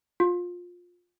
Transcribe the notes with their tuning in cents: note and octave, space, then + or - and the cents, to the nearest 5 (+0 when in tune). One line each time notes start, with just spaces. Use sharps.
F4 +20